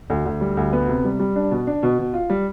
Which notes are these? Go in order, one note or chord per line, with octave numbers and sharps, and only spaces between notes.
D2
D2
G3
D2
B3
C3
G3
G3
D4
B2
D4
B2
B2
F4
G3